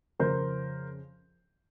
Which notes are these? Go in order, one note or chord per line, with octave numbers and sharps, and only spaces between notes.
F2 C#3 F3 A#4 C5